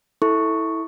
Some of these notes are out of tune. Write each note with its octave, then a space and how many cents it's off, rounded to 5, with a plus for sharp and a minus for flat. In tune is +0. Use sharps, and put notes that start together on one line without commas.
E4 -15 A4 +0 C#6 +0